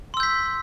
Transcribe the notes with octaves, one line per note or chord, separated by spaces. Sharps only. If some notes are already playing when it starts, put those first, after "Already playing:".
C6 E6 G6 B6